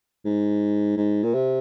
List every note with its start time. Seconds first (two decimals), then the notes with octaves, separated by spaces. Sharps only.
0.25 G#2
0.97 G#2
1.23 A#2
1.34 C3